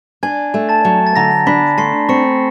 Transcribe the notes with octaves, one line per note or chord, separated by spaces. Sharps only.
D4 G#5 G#6
A3
A5 A6
F#3
A6
D3 A#5 A#6
D4 B5 B6
A3 C6 C7
C4 C#6 C#7